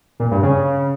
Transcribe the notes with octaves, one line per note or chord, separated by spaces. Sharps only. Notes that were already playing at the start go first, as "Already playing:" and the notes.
A#2
G2
C#3